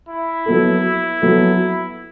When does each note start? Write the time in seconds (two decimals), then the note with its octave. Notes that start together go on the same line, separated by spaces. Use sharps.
0.09 E4
0.46 F#3 B3 A4
1.22 F#3 B3 A4